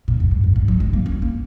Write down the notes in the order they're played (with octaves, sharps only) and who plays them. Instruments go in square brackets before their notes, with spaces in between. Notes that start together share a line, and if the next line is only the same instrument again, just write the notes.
[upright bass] A#2
F#2
G#2
F#2
G#2
F#3
G#3
A#3
C#4
A#3